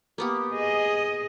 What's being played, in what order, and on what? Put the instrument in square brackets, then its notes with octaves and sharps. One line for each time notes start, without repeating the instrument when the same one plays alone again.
[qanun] A#3 B3 G4
[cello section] G#4 D#5